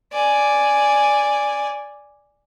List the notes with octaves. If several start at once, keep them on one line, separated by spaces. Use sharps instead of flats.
D5 G#5